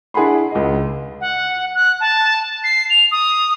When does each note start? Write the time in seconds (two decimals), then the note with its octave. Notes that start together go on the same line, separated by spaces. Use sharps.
0.14 D4 E4 G#4 F#5 B5 C6
0.51 C#2 D#5
1.21 F#5
1.74 F#6
2.00 A5
2.64 C7
2.90 F7
3.11 D#6